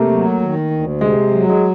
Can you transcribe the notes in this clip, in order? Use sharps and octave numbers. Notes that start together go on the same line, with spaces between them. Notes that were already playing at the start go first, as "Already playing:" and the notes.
Already playing: C3 A3 A#3
F#3
D#3
D2
C3 G#3
F#3
G#3